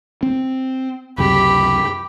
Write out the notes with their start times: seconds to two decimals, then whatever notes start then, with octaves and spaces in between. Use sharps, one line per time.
0.23 C4
1.18 C#2 F#2 C3 G4 B5